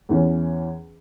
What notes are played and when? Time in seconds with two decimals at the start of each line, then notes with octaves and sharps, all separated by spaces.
0.09 E2 E3 C#4